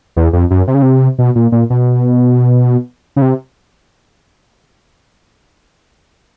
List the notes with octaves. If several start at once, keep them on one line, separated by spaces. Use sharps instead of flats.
E2
F2
F#2
C3
C#3
C3
B2
A#2
A#2
B2
C#3
C3